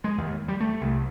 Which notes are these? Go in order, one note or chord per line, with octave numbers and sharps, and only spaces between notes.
G#3
D#2
G3
A3
C2